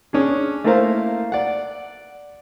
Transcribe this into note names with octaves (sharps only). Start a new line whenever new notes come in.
C#4 D4 G#4
A3 A#3 E4 A#4 C5 F5
D5 F#5